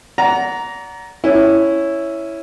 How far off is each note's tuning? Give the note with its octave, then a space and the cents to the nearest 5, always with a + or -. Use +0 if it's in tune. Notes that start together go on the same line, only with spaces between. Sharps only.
D5 -35 F#5 +0 A#5 +5
C#4 +0 E4 +0